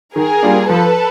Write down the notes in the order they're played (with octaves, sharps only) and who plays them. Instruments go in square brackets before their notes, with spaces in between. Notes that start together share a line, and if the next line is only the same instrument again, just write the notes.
[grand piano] D#3 [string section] G#4 A#4
[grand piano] G3 A#3 D4 F4
[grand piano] F3 [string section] A4 B4